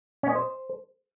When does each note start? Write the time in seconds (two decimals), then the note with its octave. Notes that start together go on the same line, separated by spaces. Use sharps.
0.23 C#4
0.29 D#5
0.35 C5